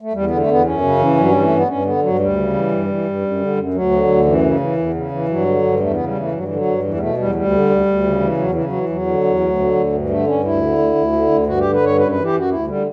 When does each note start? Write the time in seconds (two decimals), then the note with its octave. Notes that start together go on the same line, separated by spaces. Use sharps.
0.01 A3
0.13 E2 G3
0.26 D3 B3
0.38 A3
0.47 E2 B3
0.65 F#2 C#4
0.81 C#3
0.98 E3
1.16 G2 F#3
1.31 E3 G3
1.42 A3
1.50 G2
1.56 B3
1.68 G2 C#4
1.85 D3 B3
2.01 G2 F#3
2.19 D2 G3
2.36 C#3
2.53 E3
2.71 G2
2.88 E3
3.05 G2
3.22 F#2
3.40 D3
3.57 F#2
3.74 D2 F#3
3.91 D3
4.08 D2
4.25 F#2 E3
4.43 C#3
4.60 E3
4.77 E2
4.94 C#3
5.11 E3
5.28 G2 F#3
5.45 D3
5.62 G2
5.79 E2 A3
5.93 C#3 B3
6.06 G3
6.14 E3 A3
6.32 G2 F#3
6.43 E3
6.48 D3
6.55 F#3
6.66 G2
6.83 E2 E3
6.94 G3
7.00 B2 A3
7.17 E2 G3
7.29 F#3
7.35 D2 G3
7.52 D3
7.70 D2
7.86 D2
8.04 C#3
8.20 E3
8.37 E2 F#3
8.52 C#3 E3
8.64 F#3
8.73 E3
8.89 E2 F#3
9.07 D3
9.24 E2
9.40 D2
9.58 D3
9.75 D2
9.93 G2
10.09 D3 A3
10.26 G2 C#4
10.44 D2 E4
10.61 D3
10.78 D2
10.95 D2
11.12 D3
11.30 D2
11.46 G2 F#4
11.60 D3 G4
11.73 B4
11.81 G2 C#5
11.98 F#2 B4
12.12 E3 B4
12.24 G4
12.33 F#2 F#4
12.50 D2 E4
12.67 D3 G3